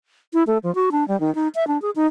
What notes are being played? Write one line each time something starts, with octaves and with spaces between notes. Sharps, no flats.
E4
A3
F3
F#4
D4
G3
D#3
D#4
E5
D4
G#4
D#4